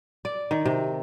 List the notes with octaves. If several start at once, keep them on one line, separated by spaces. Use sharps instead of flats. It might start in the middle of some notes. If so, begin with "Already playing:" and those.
D5
D#3
C3